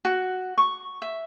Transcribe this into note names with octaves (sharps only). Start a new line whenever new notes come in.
F#4
C#6
E5